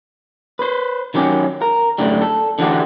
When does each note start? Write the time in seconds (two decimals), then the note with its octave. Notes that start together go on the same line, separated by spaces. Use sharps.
0.59 B4 C5
1.14 D#3 F#3 C#4 G4
1.62 A#4
1.98 F#2 A2 D3 G3
2.21 A4
2.59 D3 E3 F#4 G4